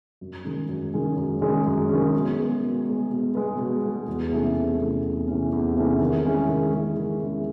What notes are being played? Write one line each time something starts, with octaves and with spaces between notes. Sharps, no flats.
F#2
D#3 G#3 C#4
F#2
D#3 G#3 C#4
F#2
D#3 G#3 C#4
F#2
D#3 G#3 C#4
B2
G#3 B3
B2
G#3 B3
B2
G#3 B3
B2
G#3 B3
E2
C3 E3 A3 C#4
E2
C3 E3 A3 C#4
E2
C3 E3 A3 C#4
E2
C3 E3 A3 C#4
D#3
G#3 C#4 E4
D#3
G#3 C#4 E4
D#3
G#3 C#4 E4